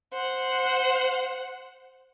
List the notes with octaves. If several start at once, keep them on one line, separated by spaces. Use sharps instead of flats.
C5 F#5